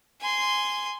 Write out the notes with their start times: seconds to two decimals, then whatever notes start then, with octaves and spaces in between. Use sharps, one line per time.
0.21 G#5 C6